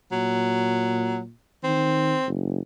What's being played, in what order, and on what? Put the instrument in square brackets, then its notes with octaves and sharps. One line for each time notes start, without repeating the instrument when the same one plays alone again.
[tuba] A#2 [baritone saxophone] F#3
[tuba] D#3 [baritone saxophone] C4
[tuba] F#1